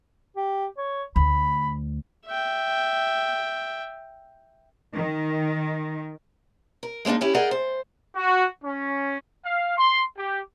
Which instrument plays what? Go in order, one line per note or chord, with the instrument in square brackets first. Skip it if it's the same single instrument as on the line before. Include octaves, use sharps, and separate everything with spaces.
[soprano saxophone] G4
C#5
[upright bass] D2 [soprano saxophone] B5
[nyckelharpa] E5 G5
[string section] D#3
[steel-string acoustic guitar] A#4
G#3 A#3 C4 D4 D#4
C#4 E4 G4
G#4 A#4 D5 D#5 F#5 G5
C5
[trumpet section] F#4
C#4
[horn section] F5
C6
G4